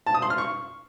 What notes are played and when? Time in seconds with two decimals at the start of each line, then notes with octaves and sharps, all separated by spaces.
0.06 A5
0.14 D#6
0.22 C6
0.30 F6
0.38 C#6